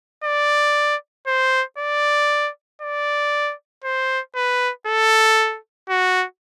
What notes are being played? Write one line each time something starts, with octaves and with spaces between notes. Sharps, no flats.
D5
C5
D5
D5
C5
B4
A4
F#4